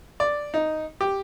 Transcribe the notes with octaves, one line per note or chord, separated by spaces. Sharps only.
D5
D#4
G4